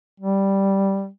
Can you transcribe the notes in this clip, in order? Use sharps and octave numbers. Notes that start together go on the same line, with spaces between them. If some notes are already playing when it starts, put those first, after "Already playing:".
G3